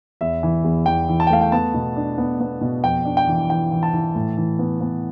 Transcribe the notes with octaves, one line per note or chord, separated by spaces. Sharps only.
E2 E5
E3
E2
E2 G5
E3
A5
G5
A3 F5
G5
B3 A5
B2
D4
B3
B3
B2
F2 G5
D4
G5
E3
E3 G5
E3
A5
E3
A2
E3
B3
B3